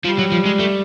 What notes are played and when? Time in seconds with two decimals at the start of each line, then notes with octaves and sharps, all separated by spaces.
0.05 F3 G3
0.19 F#3
0.32 F3
0.45 G#3
0.59 A3